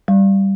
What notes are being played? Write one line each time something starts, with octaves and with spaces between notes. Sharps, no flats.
G3